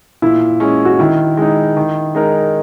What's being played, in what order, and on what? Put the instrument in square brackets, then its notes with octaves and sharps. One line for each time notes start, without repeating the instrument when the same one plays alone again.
[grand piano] A#2 [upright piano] E4
[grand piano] G#3 C#4
[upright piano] F#4
[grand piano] D#3 [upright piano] E4
[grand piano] G#3 D#4
D#3
G#3 D#4 A#4